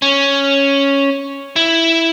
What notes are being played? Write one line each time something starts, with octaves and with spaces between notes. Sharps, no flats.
C#4
E4